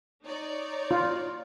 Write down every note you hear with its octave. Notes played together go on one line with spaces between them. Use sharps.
D#4 C#5 D5
F4